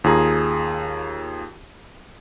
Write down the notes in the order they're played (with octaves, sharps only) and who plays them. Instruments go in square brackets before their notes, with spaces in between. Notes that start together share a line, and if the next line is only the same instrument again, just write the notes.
[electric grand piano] D#2 F4 G#4 A#5